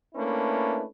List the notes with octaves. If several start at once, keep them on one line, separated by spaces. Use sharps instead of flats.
A3 A#3 C#4 D4 E4 B4